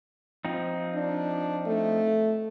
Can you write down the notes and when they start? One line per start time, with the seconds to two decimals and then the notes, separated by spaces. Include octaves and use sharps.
0.45 F3 C4 D#4
0.95 D4
1.66 A3